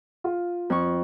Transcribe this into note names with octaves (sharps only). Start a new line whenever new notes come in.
F4
F2 C#6